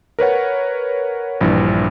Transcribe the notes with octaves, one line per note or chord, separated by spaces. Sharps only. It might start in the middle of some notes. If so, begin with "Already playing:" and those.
A#4 B4 C#5 F#5
A#1 G2 E3